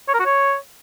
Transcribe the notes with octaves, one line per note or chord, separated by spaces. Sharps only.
C#5
A#4
F#4
C#5